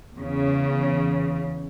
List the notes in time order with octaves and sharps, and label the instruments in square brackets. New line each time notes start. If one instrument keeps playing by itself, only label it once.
[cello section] E2 C#3